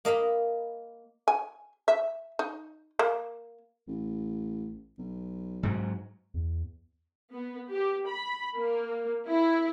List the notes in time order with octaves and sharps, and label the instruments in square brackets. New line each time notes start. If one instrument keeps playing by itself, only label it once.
[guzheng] A#3 D#5 F5 B5
[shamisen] G#5
E5
D#4
A#3
[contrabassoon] A1
B1
[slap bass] G#2 F#3
[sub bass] E2
[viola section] B3
G4
B5
A#3
E4